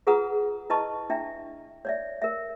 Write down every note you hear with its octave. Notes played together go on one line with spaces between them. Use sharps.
F4 G#4 B4 F#5 A#5 D#6
E4 B4 D#5 A5 C#6
D4 E4 E5 G5
C#5 D5 E5
A#4 E5